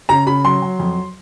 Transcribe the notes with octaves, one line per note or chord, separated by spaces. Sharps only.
C#3 A#5
C#3 B5
F#3 C6
F#3
F2